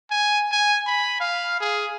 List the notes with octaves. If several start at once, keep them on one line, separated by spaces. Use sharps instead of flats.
G#5
G#5
B5
F5
G#4